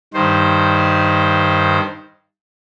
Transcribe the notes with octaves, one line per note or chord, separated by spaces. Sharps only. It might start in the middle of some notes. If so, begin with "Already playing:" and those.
G2 D#3 C5